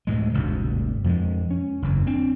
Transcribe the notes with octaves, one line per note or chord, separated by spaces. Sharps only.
D2 A2 G#3
G1 D2 G#2 C3
F2 F3 F#3 G#3
C#4
F#1 E2
C4 D4